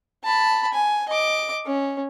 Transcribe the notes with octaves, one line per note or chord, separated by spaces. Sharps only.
A5 B5
G#5
D#5 D6
C#4